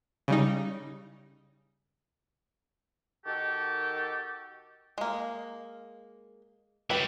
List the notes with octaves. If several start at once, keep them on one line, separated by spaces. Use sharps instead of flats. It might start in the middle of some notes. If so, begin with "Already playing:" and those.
C#3 G3 D#4
D#3 F#4 G4 A4
G#3 A#3
G3 E4 G4 B4